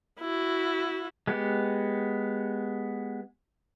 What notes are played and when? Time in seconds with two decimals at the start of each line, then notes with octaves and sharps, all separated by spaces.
0.20 E4 F#4
1.27 G#3 B3 G4 F#5